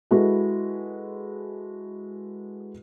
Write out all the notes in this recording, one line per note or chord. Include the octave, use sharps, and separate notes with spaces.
G#3 E4 F#4 A4 B4